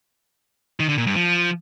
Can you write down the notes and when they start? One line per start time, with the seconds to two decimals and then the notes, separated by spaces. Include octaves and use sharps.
0.80 D#3
0.89 D3
0.98 A#2
1.07 G2
1.16 F3